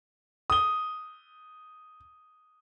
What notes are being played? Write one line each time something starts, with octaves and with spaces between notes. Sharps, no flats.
D#6 G7